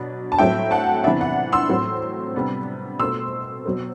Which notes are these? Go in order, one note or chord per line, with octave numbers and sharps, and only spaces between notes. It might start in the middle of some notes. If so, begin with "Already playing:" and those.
Already playing: B2 F#3 B3 D4
A5
A2 F#3 C4 E5 G5
F#5 A5
C3 E3 B3 D4 E5
F#5
C6 E6
A2 F#3 C4
C3 G3 B3 D4
B2 A3 C4 C6 E6
B2 F#3 C4